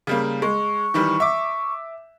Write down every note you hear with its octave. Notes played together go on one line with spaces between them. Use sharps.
C#3 G3 A#3
G#3 C#6
D#3 E3 G3
E5 D6